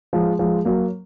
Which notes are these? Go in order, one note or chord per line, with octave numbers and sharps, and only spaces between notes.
F3 G#3
F3 G#3
F#3 A#3